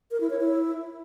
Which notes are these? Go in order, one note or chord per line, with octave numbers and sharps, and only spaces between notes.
A#4
E4
C#5
E4